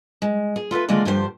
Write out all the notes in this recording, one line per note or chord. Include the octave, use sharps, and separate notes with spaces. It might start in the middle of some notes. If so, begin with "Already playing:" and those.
G#3
G#4
F4 A4 B4 E5
D3 D#3 G#3 A#3 F4 D5
D2 G2 F3 G4 C5